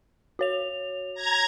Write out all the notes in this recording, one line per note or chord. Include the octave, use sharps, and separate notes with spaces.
F#4 C#5 F7
A#5 G#6